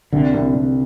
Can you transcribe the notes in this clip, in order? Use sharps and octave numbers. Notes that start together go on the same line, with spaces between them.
C2 D3
C2
C2